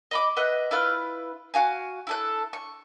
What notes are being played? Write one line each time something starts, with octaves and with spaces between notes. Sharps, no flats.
D#5 B5 D6
B4 D#5 E5 F#5
E4 F4 B4 F6
F#4 F5 G#5
E4 A4 F#6
C#6